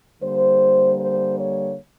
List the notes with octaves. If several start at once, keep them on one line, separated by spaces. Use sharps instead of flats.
D3 G3 A#3 C5
C5
C#5